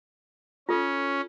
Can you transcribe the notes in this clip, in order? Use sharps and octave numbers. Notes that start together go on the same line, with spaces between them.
C#4 F4 A4